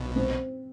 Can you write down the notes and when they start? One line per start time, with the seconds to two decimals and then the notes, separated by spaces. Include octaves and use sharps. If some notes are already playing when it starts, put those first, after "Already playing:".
Already playing: B1 B2
0.16 C4